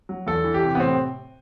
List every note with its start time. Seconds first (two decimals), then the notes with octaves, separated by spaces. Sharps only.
0.09 F#3
0.27 E2 A4
0.44 E3
0.54 G4
0.63 C3
0.75 B3
0.80 A2 C4